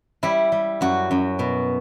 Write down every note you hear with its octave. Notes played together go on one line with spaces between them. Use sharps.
G3 E4
G3
F#2 F#4
F#2
B2